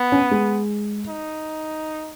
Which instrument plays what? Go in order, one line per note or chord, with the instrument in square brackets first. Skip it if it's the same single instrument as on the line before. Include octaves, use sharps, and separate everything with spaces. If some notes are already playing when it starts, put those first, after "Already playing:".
Already playing: [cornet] B3
[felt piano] C#4
G#3
[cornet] D#4